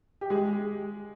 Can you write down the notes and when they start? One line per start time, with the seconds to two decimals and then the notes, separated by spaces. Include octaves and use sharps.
0.21 G4
0.30 G#3 G#4